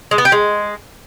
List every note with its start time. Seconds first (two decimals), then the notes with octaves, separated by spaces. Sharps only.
0.11 G#3
0.18 B3
0.25 G4
0.32 G#3